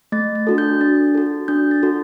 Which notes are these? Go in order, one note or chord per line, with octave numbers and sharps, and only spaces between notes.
A3 A6
A6
D4 F#4 A4
G6
D4 A6
F#4 A4
D4 G6
A6
F#4 A4